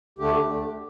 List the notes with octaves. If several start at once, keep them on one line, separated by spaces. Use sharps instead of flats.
D2 D3 A3 D4 G4
D2 D3 A3 D4